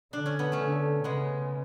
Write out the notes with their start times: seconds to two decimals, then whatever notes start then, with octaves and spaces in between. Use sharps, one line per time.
0.13 D3 D4
0.26 C#4
0.39 B3
0.52 A3 C#4
0.59 D3
1.04 C#3 G#3 B3